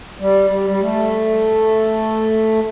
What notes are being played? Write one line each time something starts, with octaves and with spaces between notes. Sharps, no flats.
G3
G3
G3
A3